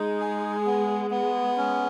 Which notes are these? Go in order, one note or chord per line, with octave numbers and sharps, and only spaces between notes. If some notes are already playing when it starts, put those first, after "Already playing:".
Already playing: G#3 D#4
G#4
B3
B3
C#4